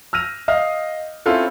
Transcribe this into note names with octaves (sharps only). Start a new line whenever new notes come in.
E6 F6 A#6 D#7 F7
D#5 F5 F6
C4 C#4 E4 F4 A4